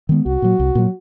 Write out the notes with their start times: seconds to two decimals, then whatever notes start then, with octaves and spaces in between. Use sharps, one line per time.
0.09 D#3 G#3 B3
0.26 C2 F#4
0.42 A#2 F#3
0.59 C2
0.75 A#2 F#3